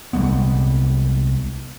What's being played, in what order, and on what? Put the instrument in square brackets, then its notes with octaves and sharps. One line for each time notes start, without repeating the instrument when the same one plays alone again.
[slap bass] C2 G3 G#3 B3